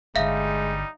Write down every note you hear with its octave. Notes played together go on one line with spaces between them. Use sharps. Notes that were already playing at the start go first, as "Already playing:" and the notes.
G1 D3 G3 G#3 D#4 E5 F5